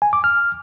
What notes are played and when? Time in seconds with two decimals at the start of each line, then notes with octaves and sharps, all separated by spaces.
0.02 G#5
0.13 D6
0.24 F6